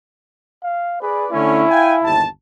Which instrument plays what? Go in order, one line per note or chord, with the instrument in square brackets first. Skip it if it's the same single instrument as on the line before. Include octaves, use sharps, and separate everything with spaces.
[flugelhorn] F5
[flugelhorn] G#4 [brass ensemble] B4 D5
[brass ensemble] D3 A3 C#4 [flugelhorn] E4
[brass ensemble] F5 G5 G#5
G1 D#2 A5